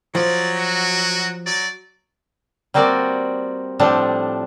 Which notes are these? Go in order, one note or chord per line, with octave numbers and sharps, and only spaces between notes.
F3 F#3 D5
F#4
F#3 D5
G3 A#3 C4 F#4 D5
A2 F3 G3 C4 D4 F#5